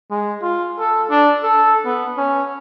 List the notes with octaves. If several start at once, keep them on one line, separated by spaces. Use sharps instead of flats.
G#3
F4
A4
D4
A4
B3
C#4